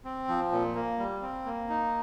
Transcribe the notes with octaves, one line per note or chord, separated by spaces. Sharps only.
C4
F3
A#2
A#3
G3
C4
A#3
D#4